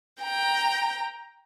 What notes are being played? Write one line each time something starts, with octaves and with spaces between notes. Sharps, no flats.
G5 A#5